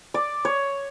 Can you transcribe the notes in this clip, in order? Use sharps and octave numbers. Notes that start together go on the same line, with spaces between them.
D5
C#5